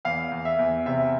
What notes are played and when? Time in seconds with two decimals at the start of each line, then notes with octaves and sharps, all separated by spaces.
0.05 E2 F5
0.32 E2
0.45 E5
0.59 E2
0.86 C3 E5